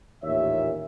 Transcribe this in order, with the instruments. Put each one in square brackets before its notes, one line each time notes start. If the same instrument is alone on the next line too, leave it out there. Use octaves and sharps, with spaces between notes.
[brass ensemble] A1 D#2 A#2 C#5 E5